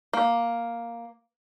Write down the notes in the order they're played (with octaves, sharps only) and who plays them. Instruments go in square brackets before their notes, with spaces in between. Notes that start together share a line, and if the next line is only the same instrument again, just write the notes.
[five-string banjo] A#3